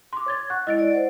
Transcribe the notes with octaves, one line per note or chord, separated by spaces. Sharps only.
C6 D6
C#5 G#6 A6
F#5 C#6 F#6
G#3 E4 D#5 A6 D7
D5
C5 F#5